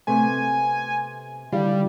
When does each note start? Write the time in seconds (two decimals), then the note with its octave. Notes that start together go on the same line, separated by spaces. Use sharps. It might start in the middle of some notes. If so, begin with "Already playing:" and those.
0.07 C3 A3 B3 G#5
1.52 D3 D#3 G3 E4 F5